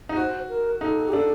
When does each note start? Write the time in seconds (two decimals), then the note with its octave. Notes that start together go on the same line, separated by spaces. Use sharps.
0.09 D#4
0.16 F#4 C5
0.49 A#4
0.81 D#4 A4
1.07 G4
1.12 D4 A4